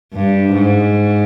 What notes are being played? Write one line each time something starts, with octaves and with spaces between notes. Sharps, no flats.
G2
G#2